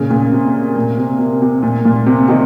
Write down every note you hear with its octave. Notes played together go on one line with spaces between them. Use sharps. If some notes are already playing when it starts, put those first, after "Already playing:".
Already playing: A#2 C#3
A#2 C#3
C3
A#2
C3
C3
C3
A#2
A#2
C3
C3 D#3